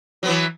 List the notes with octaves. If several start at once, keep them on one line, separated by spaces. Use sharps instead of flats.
E3 F#3 B3